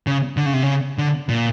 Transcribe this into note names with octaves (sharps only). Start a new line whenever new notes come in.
C#3
D3
C#3
C3
C#3
D3
A#2